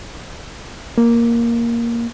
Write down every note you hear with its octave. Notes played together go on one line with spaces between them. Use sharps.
A#3